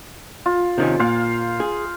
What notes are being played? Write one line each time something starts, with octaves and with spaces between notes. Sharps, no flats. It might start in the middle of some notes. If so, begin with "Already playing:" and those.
F4
C3 D#3 C#4
A#2 C5 F5
G#4